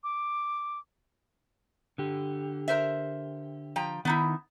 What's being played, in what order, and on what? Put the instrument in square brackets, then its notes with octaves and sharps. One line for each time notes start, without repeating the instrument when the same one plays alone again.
[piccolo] D6
[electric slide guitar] D3 G4
[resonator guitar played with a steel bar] A#4 C5 E5
F3 G5 A#5
[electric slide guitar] D#3 [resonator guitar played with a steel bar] B3 D#4 E4